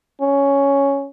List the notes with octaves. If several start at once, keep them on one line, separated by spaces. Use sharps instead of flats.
C#4